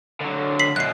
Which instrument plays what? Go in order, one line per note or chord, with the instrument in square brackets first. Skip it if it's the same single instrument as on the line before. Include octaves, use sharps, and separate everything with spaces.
[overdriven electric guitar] D3 F#3
[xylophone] B6 C7 F#7
[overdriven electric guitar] F#2 B2 [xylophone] F#6 C7